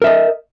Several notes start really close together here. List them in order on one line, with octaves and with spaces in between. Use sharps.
A#4 E5 D#5